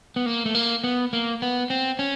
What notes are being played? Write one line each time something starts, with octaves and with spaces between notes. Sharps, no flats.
B3
A#3
A3
A#3
B3
A#3
B3
C4
C#4